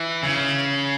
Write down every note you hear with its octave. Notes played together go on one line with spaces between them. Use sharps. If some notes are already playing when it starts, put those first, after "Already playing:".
Already playing: E3
C#3